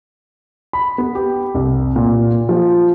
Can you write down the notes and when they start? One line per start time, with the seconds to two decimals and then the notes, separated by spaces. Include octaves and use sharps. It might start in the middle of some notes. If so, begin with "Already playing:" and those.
0.73 B5
0.98 B3
1.15 G4
1.54 C2
1.96 A#2
2.49 F3